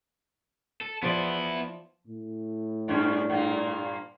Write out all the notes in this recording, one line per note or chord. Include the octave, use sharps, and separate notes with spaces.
A4
F3 B3 E4 C5 D5
A2
G2 C#4 D4
G2 A#2 A#3